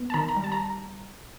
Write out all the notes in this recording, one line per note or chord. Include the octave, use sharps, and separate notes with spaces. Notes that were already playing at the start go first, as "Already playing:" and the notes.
Already playing: B3
A5
D#3 A#5
A#5
G3
A5
A#5